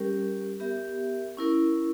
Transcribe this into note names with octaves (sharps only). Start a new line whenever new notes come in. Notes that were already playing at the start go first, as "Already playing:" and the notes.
Already playing: G3 C#4 G4 A#4
B3 G4 A#4 E5
C#4 E4 A#4